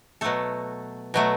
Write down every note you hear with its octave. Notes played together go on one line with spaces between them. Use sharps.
B2 F#3 A3 A4
B2 F#3 A3